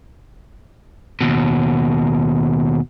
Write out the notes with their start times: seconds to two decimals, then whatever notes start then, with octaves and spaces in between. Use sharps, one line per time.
1.21 D#2 B2